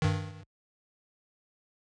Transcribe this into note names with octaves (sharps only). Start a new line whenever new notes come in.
G2 D#3